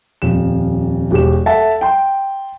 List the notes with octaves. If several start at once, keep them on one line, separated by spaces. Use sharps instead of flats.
D#1 F2 E7
E1 G4 E7
A4 E5 F#5 A5
G5 C6